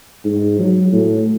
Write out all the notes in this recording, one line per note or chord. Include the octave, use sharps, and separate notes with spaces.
G#2
F#3
A2